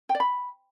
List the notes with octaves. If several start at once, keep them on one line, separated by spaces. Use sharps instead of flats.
G5
D5
B5